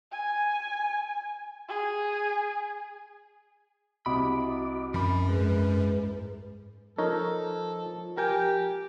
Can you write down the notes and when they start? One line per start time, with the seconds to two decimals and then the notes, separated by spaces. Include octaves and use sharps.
0.12 G#5
1.69 G#4
4.06 C2 C3 F#4 D#5 B5 D6
4.94 F#2 F3 B5
5.29 G#2 G#3 B4
6.99 F3 D#4 A4 A#4 C#5
8.17 G4 A#4 G5 G#5